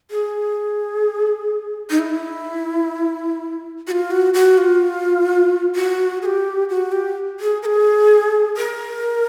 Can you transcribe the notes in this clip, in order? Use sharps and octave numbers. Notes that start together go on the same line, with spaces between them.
G#4
D#4
E4
F#4
F4
F#4
F#4
F4
F#4
G#4
G4
F#4
G4
G#4
A#4
G#4
A#4